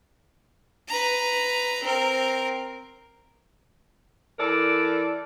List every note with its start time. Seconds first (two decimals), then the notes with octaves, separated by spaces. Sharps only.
0.88 B4 A#5
1.83 C4 A#4
4.39 E3 A4 A#4 D5